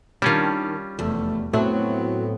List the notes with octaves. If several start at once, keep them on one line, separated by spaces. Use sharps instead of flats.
D#3 G3 C#4 D4 F4
F1 E2 A3
A2 F#3 B3 C4